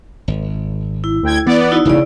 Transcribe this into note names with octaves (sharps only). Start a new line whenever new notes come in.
G#1
E4
D2 G5 G#6
E3 B3 D5
D#4 E4 F#4
E1 A1 C#3 E4 D5